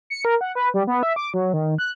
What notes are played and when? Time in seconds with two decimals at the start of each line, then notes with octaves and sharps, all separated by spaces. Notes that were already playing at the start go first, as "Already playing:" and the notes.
0.10 C#7
0.25 A#4
0.41 F#5
0.55 B4
0.74 G3
0.87 B3
1.03 E5
1.16 D6
1.34 F#3
1.53 D#3
1.78 F#6